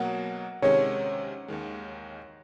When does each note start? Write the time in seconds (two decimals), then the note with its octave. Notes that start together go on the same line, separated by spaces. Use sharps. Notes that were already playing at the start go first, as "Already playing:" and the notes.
Already playing: B2 F#3 A#3 F#5
0.62 C3 D#3 G#3 C#4 C#5
1.48 D#2 D#3 G#3